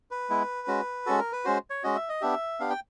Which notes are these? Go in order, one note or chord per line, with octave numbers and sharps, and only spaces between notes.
B4
G#3 B3 E4
G#3 C#4 F#4
G#3 C#4 F#4 A4
A#4
B4
G#3 C#4 F#4 C5
C#5
G#3 C#4 F#4 D#5
E5
D#5
B3 D4 G4 E5
B3 D4 G4 F5
G5